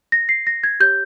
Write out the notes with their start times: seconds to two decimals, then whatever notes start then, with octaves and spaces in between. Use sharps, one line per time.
0.12 A#6
0.29 C7
0.47 A#6
0.63 G#6
0.80 G4 C#5 G6